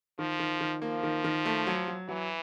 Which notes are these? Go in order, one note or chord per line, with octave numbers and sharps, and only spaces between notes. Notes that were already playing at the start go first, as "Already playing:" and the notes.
D#3 F3
D#3
D#3
F3 A#3
D#3
D#3
A3
F#3
F#3
E3 F#3